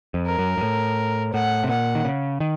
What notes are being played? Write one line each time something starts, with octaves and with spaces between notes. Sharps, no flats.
F2
A#4
F#2
F#2
A2
A2 F#5
C3
A#2 F#5
D#3
C#3
D#3